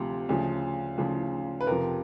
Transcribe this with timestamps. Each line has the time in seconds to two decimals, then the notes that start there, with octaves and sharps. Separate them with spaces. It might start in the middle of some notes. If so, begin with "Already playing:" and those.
Already playing: D2 C3 F3
0.29 D2 C#3 F3
0.98 D2 C#3 F3
1.61 B4
1.67 F2 C3 F3 A#4